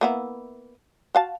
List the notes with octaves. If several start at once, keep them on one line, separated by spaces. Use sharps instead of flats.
A#3 B3 E4
F#4 F5 A5